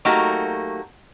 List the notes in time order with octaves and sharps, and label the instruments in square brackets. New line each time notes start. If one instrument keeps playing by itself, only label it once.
[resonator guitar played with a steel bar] F#3 A3 A#3 D#4 F#4 G4